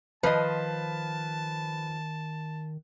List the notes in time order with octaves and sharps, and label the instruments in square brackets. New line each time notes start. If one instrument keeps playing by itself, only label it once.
[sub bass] D#3 [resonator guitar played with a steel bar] F3 C5 D#5 [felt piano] B4 [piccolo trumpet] A5